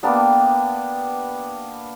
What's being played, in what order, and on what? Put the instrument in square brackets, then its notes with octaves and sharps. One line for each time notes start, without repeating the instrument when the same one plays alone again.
[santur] A#3 B3 D4 G4